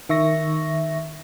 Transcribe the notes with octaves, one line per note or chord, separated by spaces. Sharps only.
D#3 E5 C#6 A#6